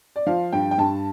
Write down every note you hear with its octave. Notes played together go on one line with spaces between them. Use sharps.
D5
F3 F5
G2 G5
G5
G2 A5